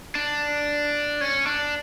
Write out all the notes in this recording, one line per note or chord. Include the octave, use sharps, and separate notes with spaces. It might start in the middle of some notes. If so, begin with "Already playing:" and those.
D4
C#4
D4